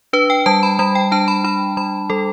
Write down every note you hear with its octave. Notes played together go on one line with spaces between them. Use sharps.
D4 B4
G5
G3 A5
B5
G3 B5
G5
D4 A5
B5
D4 B5
G3 B5
G3 A4